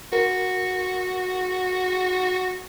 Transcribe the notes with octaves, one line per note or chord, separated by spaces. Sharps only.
F#4 A#4